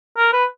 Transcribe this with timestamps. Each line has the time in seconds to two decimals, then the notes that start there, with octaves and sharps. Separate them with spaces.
0.17 A#4
0.33 B4